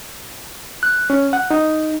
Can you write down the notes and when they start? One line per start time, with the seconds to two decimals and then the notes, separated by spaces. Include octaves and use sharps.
0.83 F#6
1.10 C#4
1.33 F#5
1.51 D#4